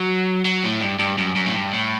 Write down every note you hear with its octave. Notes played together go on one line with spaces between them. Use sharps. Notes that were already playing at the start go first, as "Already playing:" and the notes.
Already playing: F#3
F#3
A2
G2
G2
F#2
F#2
A2
G2
A2